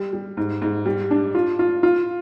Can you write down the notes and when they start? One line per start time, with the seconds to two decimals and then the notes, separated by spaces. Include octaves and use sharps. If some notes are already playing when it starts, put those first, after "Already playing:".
Already playing: G3
0.13 G3
0.37 G#2
0.62 G#2
0.86 G3
1.11 D4
1.35 F4
1.59 F4
1.83 F4